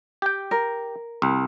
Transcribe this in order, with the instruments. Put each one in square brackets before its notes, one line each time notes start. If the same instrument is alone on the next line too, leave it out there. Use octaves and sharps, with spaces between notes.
[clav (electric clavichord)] G4 G5
[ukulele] A#4
[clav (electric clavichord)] C2